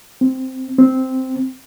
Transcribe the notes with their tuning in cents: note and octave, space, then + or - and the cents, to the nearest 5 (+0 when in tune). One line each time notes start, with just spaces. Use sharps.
C4 -5
C4 -5